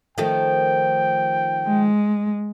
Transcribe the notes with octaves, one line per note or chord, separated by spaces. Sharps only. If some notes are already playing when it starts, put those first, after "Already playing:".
D#3 F3 A3 G5
G#3